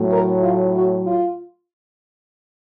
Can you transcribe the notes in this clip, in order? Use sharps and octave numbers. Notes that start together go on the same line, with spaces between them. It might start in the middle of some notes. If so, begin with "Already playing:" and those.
Already playing: A2 F#3 A3
A#4
F4
F#4
F4